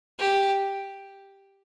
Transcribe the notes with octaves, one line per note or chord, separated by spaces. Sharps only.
G4